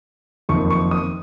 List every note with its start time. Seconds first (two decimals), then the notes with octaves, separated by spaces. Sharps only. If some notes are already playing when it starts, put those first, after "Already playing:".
0.49 F#1 F2 D#3 C#6
0.70 C#6
0.91 D#6